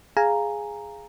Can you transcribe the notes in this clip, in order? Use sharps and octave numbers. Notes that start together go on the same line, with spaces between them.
G#4 F5 G#5 A#5